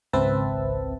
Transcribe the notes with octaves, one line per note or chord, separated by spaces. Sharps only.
G#1 C#2 C4 B4 E5 A5